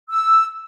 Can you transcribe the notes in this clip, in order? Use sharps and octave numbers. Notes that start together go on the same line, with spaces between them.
E6